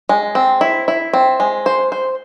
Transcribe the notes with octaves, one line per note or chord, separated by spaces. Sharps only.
G#3
C4
E4
E4
C4
G#3
C5
C5